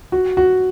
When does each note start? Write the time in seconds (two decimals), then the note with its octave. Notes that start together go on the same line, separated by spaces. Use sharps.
0.12 F#4
0.37 F#4